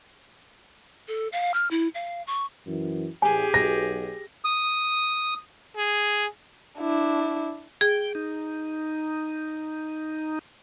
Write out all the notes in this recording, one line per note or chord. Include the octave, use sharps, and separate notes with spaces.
A4
F5
F6
E4
F5
C#6
F#2 E3
A1 G4 G#4 G#5
B1 A#6
D#6
G#4
D4 E4
G#4 G5
D#4